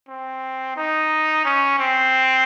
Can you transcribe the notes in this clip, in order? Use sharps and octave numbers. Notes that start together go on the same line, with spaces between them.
C4
D#4
C#4
C4